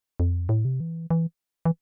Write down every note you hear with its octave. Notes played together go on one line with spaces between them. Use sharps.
F2
A2
C3
E3
E3
E3